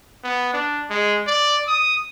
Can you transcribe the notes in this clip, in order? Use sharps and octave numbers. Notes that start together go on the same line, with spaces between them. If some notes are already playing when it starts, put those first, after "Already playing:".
B3
D4
G#3
D5
D#6